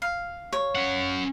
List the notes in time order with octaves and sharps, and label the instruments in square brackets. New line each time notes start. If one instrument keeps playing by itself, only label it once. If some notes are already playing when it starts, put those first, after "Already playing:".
[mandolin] F5
[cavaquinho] C#5
[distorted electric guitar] C#4 F#5